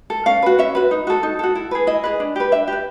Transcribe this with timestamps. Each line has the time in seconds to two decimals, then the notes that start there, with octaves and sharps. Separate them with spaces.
0.10 A4
0.26 C#4 F5
0.43 F#4 B4
0.58 C#4 E5
0.75 F#4 B4
0.91 D#4
1.07 F#4 A4
1.23 D#4
1.39 F#4 A4
1.55 E4
1.71 G#4 B4
1.87 E4 D#5
2.04 G#4 B4
2.20 D4
2.36 G4 B4
2.51 D4 E5
2.68 G4 B4